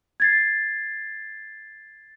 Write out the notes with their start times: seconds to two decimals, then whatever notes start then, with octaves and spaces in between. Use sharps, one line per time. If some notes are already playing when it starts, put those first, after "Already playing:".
0.20 G#6 A6 C7